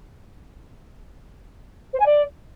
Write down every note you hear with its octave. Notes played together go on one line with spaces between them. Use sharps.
C5
G#5
D5